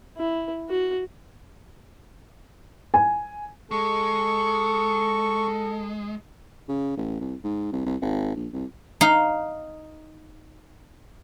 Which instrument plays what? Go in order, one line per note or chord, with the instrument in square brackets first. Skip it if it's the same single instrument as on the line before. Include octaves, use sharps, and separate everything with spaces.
[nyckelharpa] E4
F#4
[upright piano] G#5
[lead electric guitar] G#3 [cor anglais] A4 [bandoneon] C#6
[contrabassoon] C#3
A1
C2
G#2
C2
C2
G#1
A#1
C2
[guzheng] D#4 F5